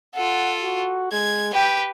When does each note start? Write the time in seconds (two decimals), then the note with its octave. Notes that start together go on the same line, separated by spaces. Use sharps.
0.15 F4 A4 F#5
0.63 F#4
1.12 G#3 G#6
1.54 G4 B4 G5